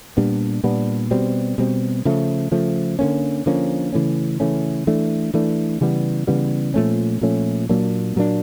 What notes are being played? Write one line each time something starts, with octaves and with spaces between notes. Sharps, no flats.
A#2 G3 B3 D4
A#2 G3 B3 D4
B2 G3 C4
B2 G3 C4
C#3 F3 A3
C#3 F3 A3
D3 F3 A#3 C#4
D3 F3 A#3 C#4
C#3 E3 A3 C#4
C#3 E3 A3 C#4
E3 A3 D4
E3 A3 D4
C#3 E3 G3 B3
C#3 E3 G3 B3
A#2 F3 A3 C#4
A#2 F3 A3 C#4
A#2 F#3 A#3 D4
A#2 F#3 A#3 D4